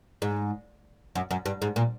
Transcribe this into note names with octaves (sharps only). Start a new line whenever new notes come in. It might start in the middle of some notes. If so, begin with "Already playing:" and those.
G#2
F#2
F#2
G2
G#2
A#2